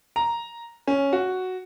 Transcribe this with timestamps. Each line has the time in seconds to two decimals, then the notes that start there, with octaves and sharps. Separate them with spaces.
0.16 A#5
0.87 C#4
1.13 F#4